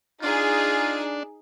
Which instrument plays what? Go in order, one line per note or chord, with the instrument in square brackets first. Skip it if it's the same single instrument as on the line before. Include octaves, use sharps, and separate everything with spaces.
[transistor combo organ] D4 [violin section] D#4 G#4 [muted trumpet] F4